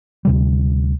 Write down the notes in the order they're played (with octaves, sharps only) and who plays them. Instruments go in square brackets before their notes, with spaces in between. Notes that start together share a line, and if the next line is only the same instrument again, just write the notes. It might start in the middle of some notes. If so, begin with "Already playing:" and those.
[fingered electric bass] D2 C3 G3